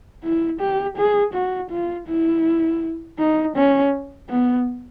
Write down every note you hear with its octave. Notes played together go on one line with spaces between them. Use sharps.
E4
G4
G#4
F#4
F4
E4
D#4
C#4
B3